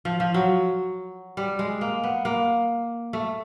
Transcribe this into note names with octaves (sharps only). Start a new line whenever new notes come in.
F3
F3
F#3
G3
G#3
A#3
B3
A#3
A3